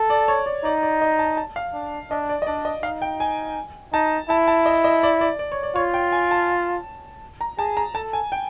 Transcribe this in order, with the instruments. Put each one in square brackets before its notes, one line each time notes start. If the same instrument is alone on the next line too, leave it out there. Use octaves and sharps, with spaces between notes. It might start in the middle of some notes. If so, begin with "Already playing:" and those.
Already playing: [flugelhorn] A4
[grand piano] D5
C#5
D5
[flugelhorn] D#4 [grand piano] D5
[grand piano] D5
D#5
A5
A5
F5
[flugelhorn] D4
[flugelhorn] D4 [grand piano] D#5
[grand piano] D5
D#5
[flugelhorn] D4 [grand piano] D5
[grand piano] D#5
[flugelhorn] D#4 [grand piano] F5
[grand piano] G5
G#5
[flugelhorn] D#4 [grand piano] A5
[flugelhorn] E4 [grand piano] A5
[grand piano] A5
D#5
D#5
D5
D5
D5
C#5
D5
[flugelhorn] F4 [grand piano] C#5
[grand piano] G5
G#5
A5
A#5
[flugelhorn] G#4 [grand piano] A5
[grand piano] A#5
[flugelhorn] A4 [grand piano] A5
[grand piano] G#5
G5